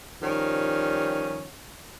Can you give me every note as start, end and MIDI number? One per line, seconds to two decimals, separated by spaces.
0.22 1.47 51
0.22 1.47 53
0.22 1.47 55
0.22 1.47 61